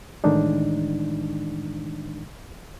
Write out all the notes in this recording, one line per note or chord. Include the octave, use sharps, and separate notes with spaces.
A2 D#3 E3 G#3 D4 D#4